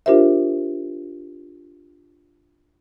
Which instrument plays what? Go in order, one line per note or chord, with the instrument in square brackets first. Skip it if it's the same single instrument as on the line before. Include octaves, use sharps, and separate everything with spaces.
[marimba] D4 F4 G4 A#4 C5 E5